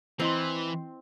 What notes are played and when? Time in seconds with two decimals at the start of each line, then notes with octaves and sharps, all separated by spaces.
0.20 E3 C4 E4 D#5 C6